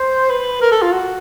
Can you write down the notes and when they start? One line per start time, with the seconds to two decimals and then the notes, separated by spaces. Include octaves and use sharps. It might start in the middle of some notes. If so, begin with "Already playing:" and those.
Already playing: C5
0.30 B4
0.61 A#4
0.71 A4
0.82 F4
0.92 F#4